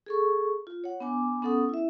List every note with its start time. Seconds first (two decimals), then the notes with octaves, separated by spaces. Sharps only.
0.06 G#4 A4 C#6
0.67 F4
0.84 C#5 F#5
1.00 B3 D4 G#5 D6
1.42 B3 C#4 A4 F#5 D#6
1.69 E4 E5